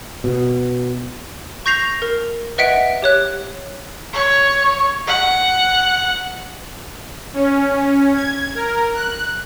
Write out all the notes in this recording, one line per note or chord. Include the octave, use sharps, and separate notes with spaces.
B2
C#6 G6 A#6 C7 F7
A#4
B4 D#5 E5 F#5 B6 D7
G4 C#5 F#6
C#5
F#5
C#4
G#6
A#4
F#6